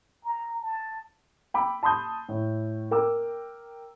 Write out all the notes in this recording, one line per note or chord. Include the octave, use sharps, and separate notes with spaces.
A#5
A5
G5 B5 D6 E6
A5 B5 C6 D#6 G6
A2
A#4 G5 D6 E6